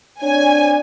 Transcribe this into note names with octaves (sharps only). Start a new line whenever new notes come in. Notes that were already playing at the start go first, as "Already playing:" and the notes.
C4 D4 C#5 G#5